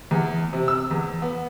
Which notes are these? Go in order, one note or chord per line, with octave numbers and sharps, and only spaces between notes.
E2
C3
E6
E2
B3